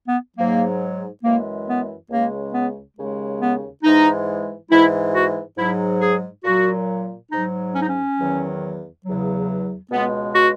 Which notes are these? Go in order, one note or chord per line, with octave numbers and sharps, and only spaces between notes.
B3
G#2 F#3 A#3
F#2 E3 G#3 A#3
B3
C#2 C#3 G#3 A#3
B3
D#2 C#3 G#3
B3
G#2 E3 G#3 D#4
G#2 E3 G#3 E4
F#4
G#2 F#3 E4
G#4
A#2 F#3 F#4
G#2 F#3 D#4
C#4
D#4
C#4
E2 D#3 F#3
E2 C#3 F#3
C#2 B2 G#3 B3
F#4